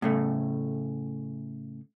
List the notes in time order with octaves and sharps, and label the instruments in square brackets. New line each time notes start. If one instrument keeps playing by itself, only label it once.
[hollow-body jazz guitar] A2 C#3 A3